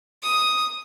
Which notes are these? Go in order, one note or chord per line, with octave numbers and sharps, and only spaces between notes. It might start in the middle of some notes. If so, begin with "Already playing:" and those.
D#6